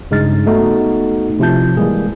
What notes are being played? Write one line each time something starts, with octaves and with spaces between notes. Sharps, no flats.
G2 C#3 G#3 D#4 F6 A6
A3 B3 D#4 F#4 A4
C3 F3 E4 F4 A5 G6
E3 G3 G#3 A#3 G#4